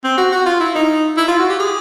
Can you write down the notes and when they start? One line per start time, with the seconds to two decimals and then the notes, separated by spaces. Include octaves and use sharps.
0.04 C4
0.17 F#4
0.32 F#4
0.46 F4
0.60 E4
0.75 D#4
1.17 E4
1.28 F4
1.39 F#4
1.49 G4
1.60 G#4